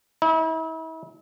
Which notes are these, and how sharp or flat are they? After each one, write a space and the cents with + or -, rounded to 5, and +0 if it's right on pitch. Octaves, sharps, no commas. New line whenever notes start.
E4 -40